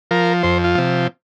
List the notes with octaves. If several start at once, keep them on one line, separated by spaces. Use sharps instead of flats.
F3 A#4
F2 C5
F4
C3 F3